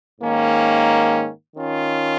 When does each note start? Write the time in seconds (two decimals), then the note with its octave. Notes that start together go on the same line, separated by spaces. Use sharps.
0.21 G#2 D#3 A#3 C#4
1.57 D#3 C#4 F4